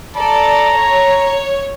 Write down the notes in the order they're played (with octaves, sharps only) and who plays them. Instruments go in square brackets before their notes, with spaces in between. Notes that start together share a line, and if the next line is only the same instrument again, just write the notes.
[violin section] A4 D5 [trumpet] A#5
[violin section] C#5